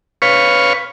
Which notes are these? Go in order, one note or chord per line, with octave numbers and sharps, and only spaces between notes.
B4 C#5 F5 C#6